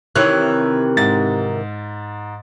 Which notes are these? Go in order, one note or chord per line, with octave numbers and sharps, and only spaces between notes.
C3 D#3 E3 C#5 F#6
G#2 A6